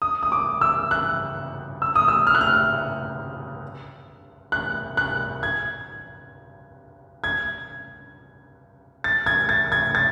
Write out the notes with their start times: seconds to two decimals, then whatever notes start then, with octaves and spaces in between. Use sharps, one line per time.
0.02 D#6
0.23 D#6
0.32 D6
0.61 E6
0.91 F#6
1.82 E6
1.95 D#6
2.08 E6
2.27 F6
2.35 F#6
2.41 F6
4.52 F#6
4.97 F#6
5.43 G#6
7.24 G#6
9.04 A6
9.26 G#6
9.49 A6
9.72 G#6
9.95 A6